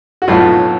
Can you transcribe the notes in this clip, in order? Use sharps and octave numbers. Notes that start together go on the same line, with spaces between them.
F#4
B1 A2 F#3 F4